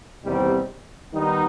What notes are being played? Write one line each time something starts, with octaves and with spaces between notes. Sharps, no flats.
E2 C3 D#3 G3 C4
D#3 G3 B3 D#4